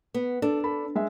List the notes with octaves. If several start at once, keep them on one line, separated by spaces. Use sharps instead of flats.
B3
D4 A4
A4 B5
G#3 E5